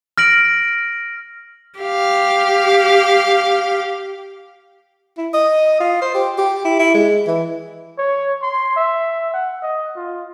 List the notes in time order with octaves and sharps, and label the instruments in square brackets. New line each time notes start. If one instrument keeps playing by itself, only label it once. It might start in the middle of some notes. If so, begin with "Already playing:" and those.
[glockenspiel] F6 A#6 D7 F#7
[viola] G4 F5
[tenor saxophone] E4
D#5
F4
C5
G4
G4
E4
E4
G#3
E3
[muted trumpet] C#5
C6
E5
F#5
D#5
F4